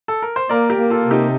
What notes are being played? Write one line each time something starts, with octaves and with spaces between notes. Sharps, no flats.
A4
A#4
C5
A#3 A#4 D5
G4 A#4
A#3
F4 A4
C3
D#4 G4